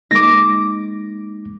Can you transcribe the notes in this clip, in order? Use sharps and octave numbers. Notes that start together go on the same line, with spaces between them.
G#3 A#3 D#4 D6 A#6